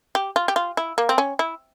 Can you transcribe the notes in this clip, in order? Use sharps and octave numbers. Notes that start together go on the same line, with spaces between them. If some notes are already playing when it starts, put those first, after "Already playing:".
G4
F4
G4
F4
E4
A#3
C4
C#4
E4